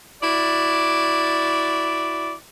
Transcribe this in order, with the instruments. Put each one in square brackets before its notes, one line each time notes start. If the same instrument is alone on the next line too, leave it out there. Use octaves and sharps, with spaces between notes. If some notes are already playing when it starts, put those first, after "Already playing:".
[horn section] E4 F#4 D5